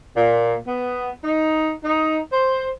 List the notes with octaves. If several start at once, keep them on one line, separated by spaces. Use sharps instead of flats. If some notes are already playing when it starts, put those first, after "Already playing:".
A#2
B3
D#4
D#4
C5